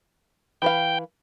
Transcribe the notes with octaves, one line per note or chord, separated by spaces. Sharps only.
E3 B4 F5 G5